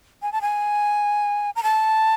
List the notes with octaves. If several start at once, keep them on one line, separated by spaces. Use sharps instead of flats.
G#5
A5
G#5
A#5
A5